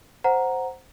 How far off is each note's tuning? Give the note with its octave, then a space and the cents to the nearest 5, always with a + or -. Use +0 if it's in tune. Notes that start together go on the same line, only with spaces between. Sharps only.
C5 +0 F#5 +0 A#5 +0